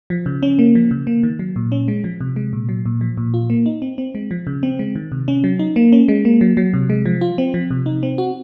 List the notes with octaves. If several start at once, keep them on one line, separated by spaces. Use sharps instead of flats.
F3
C#3
C#4
A#3
F3
C#3
A#3
D#3
F#3
A#2
C#4
G#3
F3
C3
G#3
A#2
F#3
A#2
F3
A#2
F4
A#3
D#4
C4
C4
G#3
F3
C#3
C4
G#3
D#3
C3
C#4
F#3
D#4
A#3
C#4
G#3
A#3
F#3
F#3
C3
G#3
F3
F4
C4
F3
C3
D#4
C4
F#4